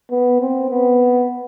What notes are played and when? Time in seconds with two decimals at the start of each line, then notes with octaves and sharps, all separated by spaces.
0.11 B3
0.40 C4
0.71 B3